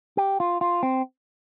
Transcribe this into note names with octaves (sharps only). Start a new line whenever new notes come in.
G4
F4
F4
C4